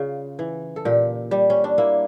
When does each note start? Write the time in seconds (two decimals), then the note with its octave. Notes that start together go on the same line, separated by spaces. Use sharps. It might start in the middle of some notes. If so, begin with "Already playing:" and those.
Already playing: C#3 F4
0.39 E3
0.76 A4
0.85 A#2 G4
1.31 G3
1.50 C#4
1.64 D4
1.78 A#3 E4